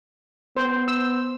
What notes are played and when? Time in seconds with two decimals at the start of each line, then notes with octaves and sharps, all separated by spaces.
0.57 B3 C5
0.88 E6